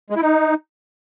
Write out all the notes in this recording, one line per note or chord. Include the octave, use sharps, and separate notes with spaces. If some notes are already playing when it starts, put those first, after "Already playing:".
G#3
E4
D#4